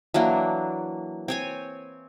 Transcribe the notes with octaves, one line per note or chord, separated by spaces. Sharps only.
E3 F#3 A#3 D4
C4 C#5 G#5